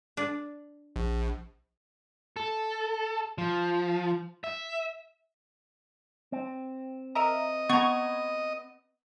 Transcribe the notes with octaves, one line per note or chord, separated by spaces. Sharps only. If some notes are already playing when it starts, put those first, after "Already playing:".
D4
A#1
A4
F3
E5
C4
A#4 D#5 E5 A#5
B3 A#5 C#6 G#6